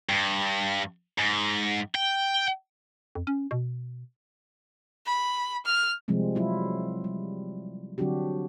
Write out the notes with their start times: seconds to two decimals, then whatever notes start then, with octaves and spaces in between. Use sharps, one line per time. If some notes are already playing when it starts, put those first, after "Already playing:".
0.09 G2
1.18 G#2
1.95 G5
3.15 F2
3.27 C#4
3.51 B2
5.06 B5
5.65 F6
6.08 C3 F3 G3 G#3 C4
6.35 F#3 E4 F4
7.04 G3
7.98 D3 F#3 C4 D4 F#4 G4